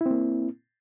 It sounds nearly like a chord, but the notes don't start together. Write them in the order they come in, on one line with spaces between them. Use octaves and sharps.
E4 C4 A#3